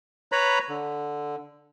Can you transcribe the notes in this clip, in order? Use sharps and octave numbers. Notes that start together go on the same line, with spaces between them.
B4 C#5 A#5 B5
D3